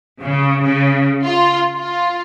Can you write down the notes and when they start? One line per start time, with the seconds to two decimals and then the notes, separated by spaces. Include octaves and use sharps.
0.22 C#3
0.64 C#3
1.24 F4
1.75 F4